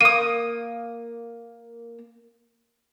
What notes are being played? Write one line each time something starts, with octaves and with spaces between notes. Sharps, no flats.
A#3 D#6 D#7